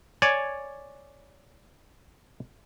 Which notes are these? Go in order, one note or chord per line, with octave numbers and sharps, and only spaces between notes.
C#5 D5 G#5